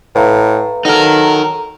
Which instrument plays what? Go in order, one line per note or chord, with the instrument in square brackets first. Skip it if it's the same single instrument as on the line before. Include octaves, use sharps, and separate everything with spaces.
[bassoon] A2 [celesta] B4 F5 A#5
[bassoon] F#3 [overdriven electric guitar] D#4 A#4 [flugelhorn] A4